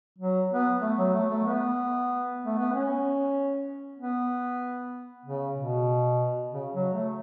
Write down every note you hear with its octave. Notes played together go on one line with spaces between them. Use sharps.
F#3
B3
A3
F#3
A3
A3
B3
A3
B3
C#4
B3
C#3
B2
C#3
F#3
A3